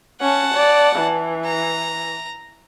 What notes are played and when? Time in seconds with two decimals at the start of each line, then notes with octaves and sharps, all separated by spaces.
0.21 C#4 F#5 A5
0.55 D5
0.96 E3
1.45 A#5